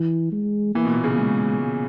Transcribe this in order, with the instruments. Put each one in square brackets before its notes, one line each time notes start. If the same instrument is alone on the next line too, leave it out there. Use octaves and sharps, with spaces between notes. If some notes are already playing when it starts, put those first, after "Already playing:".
Already playing: [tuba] E3
G#3
[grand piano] E3 [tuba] A#3
[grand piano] B2
A#2
C#3
[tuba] G#3